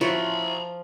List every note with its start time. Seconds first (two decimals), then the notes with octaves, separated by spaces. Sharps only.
0.01 F3 E4 F#4 C#5 A#5 B5